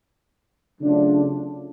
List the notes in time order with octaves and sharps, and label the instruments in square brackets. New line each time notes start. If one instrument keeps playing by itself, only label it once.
[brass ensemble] C#3 F#3 A3 D4 F4